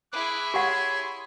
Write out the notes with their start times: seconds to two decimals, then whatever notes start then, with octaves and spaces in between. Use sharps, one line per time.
0.13 E4 G#4 D6 F#6
0.54 G4 C#5 F#5 C6